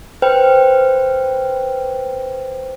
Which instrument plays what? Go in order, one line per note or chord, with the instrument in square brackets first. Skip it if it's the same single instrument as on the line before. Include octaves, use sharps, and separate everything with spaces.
[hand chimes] B4 C5 G5